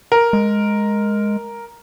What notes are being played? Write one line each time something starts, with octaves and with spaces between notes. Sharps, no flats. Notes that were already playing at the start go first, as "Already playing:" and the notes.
A#4
G#3